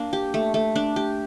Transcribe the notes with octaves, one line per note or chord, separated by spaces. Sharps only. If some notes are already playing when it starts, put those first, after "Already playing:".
Already playing: A#3 D4
G4
A3
A3
D4
G4